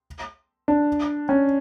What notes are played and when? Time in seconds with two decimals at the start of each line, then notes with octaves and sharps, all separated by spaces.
0.68 D4
1.29 C#4